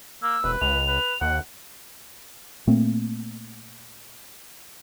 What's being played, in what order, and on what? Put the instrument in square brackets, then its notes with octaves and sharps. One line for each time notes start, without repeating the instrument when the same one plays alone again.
[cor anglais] A#3 [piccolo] E6
[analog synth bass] E1 [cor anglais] B4
[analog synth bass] C#2 [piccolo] F7
[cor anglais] B4
[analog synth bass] D#2 [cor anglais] F#5
[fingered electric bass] A#2 A3 A#3 C4